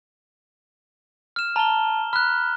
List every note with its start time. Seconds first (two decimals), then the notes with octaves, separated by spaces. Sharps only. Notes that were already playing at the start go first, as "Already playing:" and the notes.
1.36 F6 E7
1.56 A5 A#5 G7
2.13 B5 F6 F#6